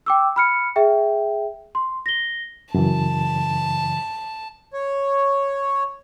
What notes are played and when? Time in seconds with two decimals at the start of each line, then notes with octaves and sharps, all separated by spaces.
0.06 G5 D6 E6
0.36 B5 F6 C#7
0.76 G#4 E5 G5
1.75 C6
2.06 A#6 G7
2.74 F#2 C#3 E3 A5
4.73 C#5